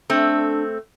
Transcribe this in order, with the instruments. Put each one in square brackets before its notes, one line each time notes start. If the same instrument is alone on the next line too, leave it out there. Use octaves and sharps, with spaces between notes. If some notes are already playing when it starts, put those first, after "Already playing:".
[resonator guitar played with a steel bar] A3 C4 [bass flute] D4